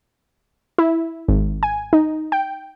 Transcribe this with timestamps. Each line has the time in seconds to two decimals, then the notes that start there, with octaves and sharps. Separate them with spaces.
0.78 E4
1.28 G#1
1.63 G#5
1.93 D#4
2.32 G5